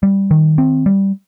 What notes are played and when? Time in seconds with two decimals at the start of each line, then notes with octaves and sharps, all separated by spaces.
0.03 G3
0.31 D#3
0.58 C4
0.86 G3